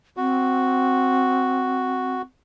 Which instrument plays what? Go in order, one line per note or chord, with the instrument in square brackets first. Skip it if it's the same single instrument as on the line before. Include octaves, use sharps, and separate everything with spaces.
[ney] C4 [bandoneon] F#4